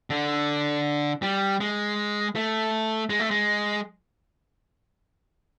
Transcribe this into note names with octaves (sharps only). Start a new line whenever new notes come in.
D3
G3
G#3
A3
G#3
A3
G#3